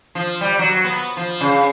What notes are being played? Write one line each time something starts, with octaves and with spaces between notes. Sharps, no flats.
F3
G3
F#3
B3
F3
C#3